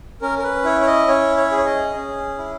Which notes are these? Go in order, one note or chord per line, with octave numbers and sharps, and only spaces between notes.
C#4 A#4
A#4
B4
E4 C#5
C#5
D#5
C#4 C#5
C#5
G#4
C#5
D#5
C#4
E4